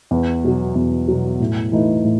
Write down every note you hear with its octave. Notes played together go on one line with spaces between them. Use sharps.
E2
B2 F#3
E2
B2 F#3
A2
E3 A3 D#4
A2